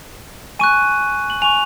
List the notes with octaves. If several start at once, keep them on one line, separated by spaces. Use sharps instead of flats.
G#5 C#6 F#6 D#7
F#7
G#5 C#6 F#6 F7